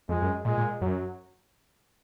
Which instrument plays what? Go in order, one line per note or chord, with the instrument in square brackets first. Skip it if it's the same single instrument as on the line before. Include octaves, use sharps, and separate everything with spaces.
[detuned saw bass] F2 [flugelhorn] G#3
[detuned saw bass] F#2
[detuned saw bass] A#2 [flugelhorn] G#3
[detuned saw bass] A#2
[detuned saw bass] F#2 [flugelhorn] F#3